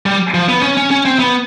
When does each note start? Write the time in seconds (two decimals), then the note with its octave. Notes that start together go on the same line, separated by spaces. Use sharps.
0.06 G3
0.34 F3
0.49 B3
0.62 C#4
0.77 C#4
0.91 C#4
1.05 C4
1.19 B3